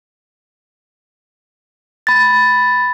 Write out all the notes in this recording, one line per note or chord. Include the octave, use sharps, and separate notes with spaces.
B5 A6